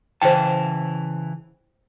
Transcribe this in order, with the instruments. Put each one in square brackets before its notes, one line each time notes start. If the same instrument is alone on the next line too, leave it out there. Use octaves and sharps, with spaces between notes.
[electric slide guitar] C#3 E3 A5 [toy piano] C5 G5